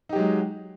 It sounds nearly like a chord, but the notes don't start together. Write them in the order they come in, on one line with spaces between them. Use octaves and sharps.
D#4 G4 F#3 G#3